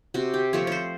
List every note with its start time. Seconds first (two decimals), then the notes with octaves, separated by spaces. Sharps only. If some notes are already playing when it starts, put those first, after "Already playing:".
0.14 C3 F#4
0.34 G4
0.53 F3 A3 C4 C#5
0.67 C5 C#5